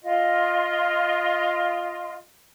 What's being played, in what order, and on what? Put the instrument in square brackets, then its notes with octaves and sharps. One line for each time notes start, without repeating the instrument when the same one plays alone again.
[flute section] F4 D#5